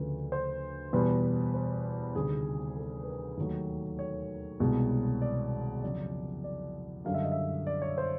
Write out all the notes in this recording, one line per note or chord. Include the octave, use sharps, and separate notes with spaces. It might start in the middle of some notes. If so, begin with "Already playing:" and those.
Already playing: D2 C#3 F3 A3 B4
C5
E2 B2 G3 B4
C5
D2 C3 D#3 G3 G#4
A4
B4
A#4
D#2 D#3 F#3 A3
C#5
C2 B2 G#3
D5
F2 C#3 F#3 D5
D5
F#2 D3 G3 F5
E5
D#5
E5
D5
C#5
C5